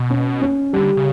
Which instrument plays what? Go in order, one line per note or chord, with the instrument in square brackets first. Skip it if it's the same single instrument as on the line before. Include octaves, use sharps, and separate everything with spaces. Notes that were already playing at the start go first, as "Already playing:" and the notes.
Already playing: [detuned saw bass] B2
[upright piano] C#4
C#4
[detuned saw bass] D3 [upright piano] G3
[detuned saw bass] C#3